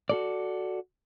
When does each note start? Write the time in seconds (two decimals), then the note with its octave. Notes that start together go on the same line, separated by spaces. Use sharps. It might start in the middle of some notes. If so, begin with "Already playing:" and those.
0.09 F#4 A4 D5